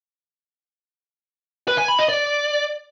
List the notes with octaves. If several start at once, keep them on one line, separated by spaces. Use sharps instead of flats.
B4
G#5
B5
D#5
D5